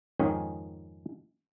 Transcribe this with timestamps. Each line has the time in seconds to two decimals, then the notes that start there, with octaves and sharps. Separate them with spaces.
0.19 F2 G#2 D#3 C#4 G#4 G5